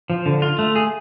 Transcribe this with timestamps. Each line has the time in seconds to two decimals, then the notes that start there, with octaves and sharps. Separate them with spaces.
0.10 F3
0.26 D3
0.42 F4
0.59 A3
0.76 G#4